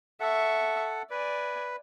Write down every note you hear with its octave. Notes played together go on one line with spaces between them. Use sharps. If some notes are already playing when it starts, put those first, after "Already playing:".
A4 E5 F#5 C#6
B4 D5 G#5